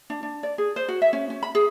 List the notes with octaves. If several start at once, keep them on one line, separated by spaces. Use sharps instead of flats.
D4
D4
D5
G#4
C5
F#4
E5
C#4
C#4
B5
G#4